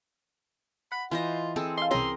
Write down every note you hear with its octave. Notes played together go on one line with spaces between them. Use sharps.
F#5 B5
E3 F4 C5 D#5
C4 G#4 A4
D#5 F5 C6
C2 C4 C#4 G#4 A#4 C6